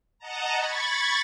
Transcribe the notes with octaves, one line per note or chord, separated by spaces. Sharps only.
D#5 F#5 A5 A#5
B5 C#6 G#6 A6